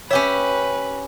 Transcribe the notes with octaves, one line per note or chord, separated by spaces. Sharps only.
C#4 G4 B4 C#5 E5